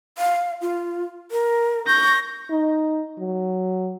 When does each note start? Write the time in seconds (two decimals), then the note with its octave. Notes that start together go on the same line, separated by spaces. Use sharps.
0.18 F5
0.61 F4
1.31 A#4
1.87 C#6 G6 A#6
2.50 D#4
3.19 F#3